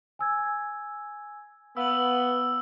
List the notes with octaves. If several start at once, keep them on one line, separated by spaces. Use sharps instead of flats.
G#5 E6 G#6
B3 F5 E6 F#7